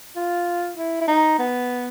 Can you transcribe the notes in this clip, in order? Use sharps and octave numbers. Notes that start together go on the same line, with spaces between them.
F4
E4
E4
D#4
B3